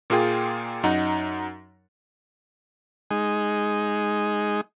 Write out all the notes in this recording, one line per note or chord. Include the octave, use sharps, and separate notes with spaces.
A#2 A#3 F4 G#4 G5
F#2 D#4 F#5 A#5
G#3 D#4